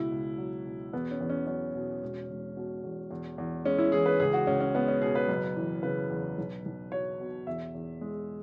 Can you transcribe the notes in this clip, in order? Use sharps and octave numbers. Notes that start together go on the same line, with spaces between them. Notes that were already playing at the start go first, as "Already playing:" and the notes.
Already playing: C#2 B2 E4
C#2
F#3
B2
E2 B3
C#4
E2
C#4
F#3 C#4
B2
E1
E1
B2
E2
E2
E2
G#3 C#4
E4
E3 G#4
B4
C#2 G#4
F#4
C#2 C#4
C#4
G#3 B3
C#4
B2 G#4
B4
F#1
E3
C#3 B4
E2
B1
B1
F#3 C#5
B2
E2 E5
E2
G#3